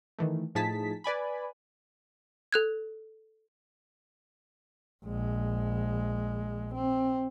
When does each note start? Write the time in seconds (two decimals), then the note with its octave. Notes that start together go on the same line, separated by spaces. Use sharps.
0.19 D#3 E3 A3
0.55 A2 F3 D#4 G#4 A5 B6
1.04 B4 D5 G#5 B5
2.52 A4 F#6 G#6
5.05 A#1 G#3
6.74 C4